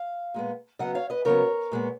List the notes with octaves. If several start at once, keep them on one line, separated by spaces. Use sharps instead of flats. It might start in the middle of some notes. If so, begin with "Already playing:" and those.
Already playing: F5
A#2 G#3 B3
C#3 F#3 B3 D#5 F#5
C#5 F5
B4 D#5
C#3 F#3 B3 A#4 C#5
A#2 G#3 B3